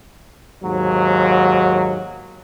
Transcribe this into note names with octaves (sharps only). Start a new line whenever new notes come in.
D#2 G#2 F#3